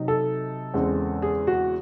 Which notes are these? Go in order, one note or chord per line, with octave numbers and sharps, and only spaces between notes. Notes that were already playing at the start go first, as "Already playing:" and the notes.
Already playing: C3 F#3 C4 D#4
A4
E2 C#3 G#3 C4
G#4
F#4